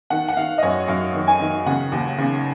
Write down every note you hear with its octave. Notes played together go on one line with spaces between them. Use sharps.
D#3 F#5
F#5
D#3 F5
D#5
F#2 C#5
F#2 F5
D#3
G#5
D#3
C#3 F#5
D#2
C#3